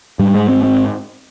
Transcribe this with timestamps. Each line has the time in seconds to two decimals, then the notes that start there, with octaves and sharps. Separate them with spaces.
0.19 G#2 G3
0.34 G#3
0.49 C4
0.63 C4